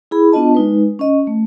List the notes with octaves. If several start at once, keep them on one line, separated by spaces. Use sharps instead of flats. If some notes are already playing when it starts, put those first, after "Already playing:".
E4 G#4 B5
B3 D4 F4 D#5 A5
G#3 D#4 B4
C#4 D#5
A3